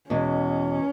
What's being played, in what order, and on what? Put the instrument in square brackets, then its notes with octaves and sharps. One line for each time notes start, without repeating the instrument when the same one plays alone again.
[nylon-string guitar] E2 B2 G#3 [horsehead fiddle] C#4